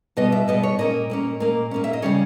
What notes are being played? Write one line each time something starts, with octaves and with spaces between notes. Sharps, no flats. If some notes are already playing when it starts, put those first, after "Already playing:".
B2 G3 B3 D#5
E5
B2 G3 B3 D#5
C#5
A#2 A#3 C#4 D#5
A#2 A#3 C#4
A#2 A#3 C#4
A#2 A#3 C#4
E5
D#5
C#3 G3 C#4 C#5